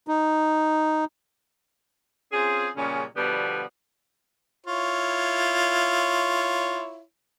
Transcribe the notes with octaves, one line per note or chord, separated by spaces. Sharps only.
D#4
C4 C#4 F4 G#4
A#2 C#3 G3 G#3 C#4
B2 D3 F3 G3 B3
E4 F4 C#5